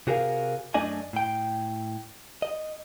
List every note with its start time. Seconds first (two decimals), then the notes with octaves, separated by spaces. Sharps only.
0.07 C3 F#4 G#4 A#4 D#5 F5
0.74 F#2 A3 D4 D5 D#5 G#5
1.13 A2 G5
2.42 D#5